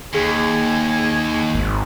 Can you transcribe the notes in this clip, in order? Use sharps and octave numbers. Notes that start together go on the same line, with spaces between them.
D#2 G#4 G#5
G#1